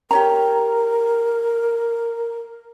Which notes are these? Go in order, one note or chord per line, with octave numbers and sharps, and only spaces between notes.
G4 A#4 C#5 A#5